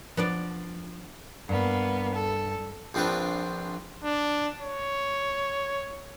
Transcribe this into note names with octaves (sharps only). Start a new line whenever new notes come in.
F3 B3 D4 D5
G2 A#3 B3
A4
A#1 F3 C4 D4 B4 C5
D4
C#5